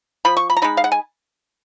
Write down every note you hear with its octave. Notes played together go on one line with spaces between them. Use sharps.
F3 B5
C#6
B5
A#5
G#3 D#4 B5
F5
F#5
G#5